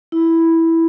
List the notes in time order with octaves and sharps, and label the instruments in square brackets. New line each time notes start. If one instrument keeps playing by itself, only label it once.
[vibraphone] E4